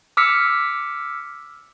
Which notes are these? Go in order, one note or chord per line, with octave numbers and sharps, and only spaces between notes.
D6 E6 F6 B6 C#7